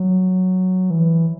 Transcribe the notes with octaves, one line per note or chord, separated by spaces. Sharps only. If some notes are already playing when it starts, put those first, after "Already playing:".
Already playing: F#3
E3